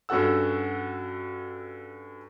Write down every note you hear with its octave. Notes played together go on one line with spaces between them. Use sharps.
G2 C#4 F#4 A4 F#5 E6